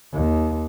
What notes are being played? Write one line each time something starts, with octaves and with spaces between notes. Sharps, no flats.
D#2